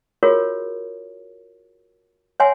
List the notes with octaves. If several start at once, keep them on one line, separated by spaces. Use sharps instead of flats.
F4 F#4 G#4 A#4 C#5
C#5 E5 F#5 G#5 C6